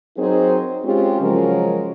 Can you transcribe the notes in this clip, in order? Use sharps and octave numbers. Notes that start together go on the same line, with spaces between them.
F#3 C4 D#4 G#4 A#4 C5
G#3 C4 C#4 F4 G4
C#3 F3 F#3 G#3 C#4 A#4